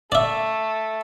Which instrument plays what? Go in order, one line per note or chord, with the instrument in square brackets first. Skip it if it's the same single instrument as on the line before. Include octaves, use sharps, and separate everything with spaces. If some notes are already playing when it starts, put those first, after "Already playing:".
[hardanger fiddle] A3 [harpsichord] D5 E5